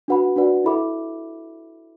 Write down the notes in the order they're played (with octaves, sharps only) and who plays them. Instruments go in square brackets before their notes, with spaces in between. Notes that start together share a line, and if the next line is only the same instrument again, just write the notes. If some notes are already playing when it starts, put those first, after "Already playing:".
[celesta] D4 F#4 B4 F#5 B5
D4 F#4 B4 D5 F#5
E4 A4 E5 B5 D6